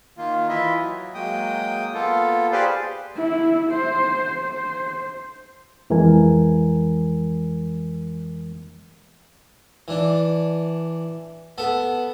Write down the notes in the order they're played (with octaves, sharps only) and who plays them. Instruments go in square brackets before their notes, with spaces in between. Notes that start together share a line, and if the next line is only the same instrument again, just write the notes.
[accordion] D#3 A#3 F4
E3 E4 F4 D#5 E5
F#3
F#3 G#3 A#3 G5 D#6
A#3 B3 F4 A4
G4 G#4 B4 C5 D5 F5
[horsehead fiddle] E4
C5
C5
[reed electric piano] F2 E3 G#3 A#4 G#5
[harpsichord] E3 D4
B3 A4